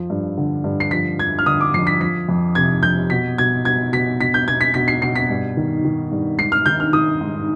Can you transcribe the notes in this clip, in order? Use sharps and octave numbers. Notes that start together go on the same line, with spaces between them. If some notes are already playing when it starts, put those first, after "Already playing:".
Already playing: F2 F3
G2
D3
G2
C7
F3 B6
F2 G#6
F6
D3 D#6
D6
F2 C7
B6
F3 B6
F2
C3 G#6
F2 G6
B2 B6
B2 G#6
B2 G#6
B2 B6
B2 B6
G6
B2 G#6
B6
B2 B6
C7
B2 C7
B6
G2
D#3
D#3
G2
G#2 C7
F6
D#3 G6
F6
D#3 D#6
G#2